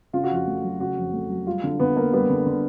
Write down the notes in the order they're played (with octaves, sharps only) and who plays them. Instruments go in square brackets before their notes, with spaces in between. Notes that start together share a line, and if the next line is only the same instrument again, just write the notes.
[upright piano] C#3 [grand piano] F4
[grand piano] F#4
[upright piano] F2 [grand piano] F4
[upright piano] A3
F#3
[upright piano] C#3 [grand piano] F#4
[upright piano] F2
A3
F#3
[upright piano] G3 [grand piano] F4
[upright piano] D3
[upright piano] D3 [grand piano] B3
[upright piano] A#3
[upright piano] G3 [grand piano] B3
[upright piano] D3
D3